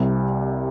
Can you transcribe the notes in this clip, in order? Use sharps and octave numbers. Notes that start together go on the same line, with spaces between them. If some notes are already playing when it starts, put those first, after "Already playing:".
Already playing: C2 C3 G3